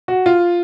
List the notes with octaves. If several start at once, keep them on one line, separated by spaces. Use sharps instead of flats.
F#4
F4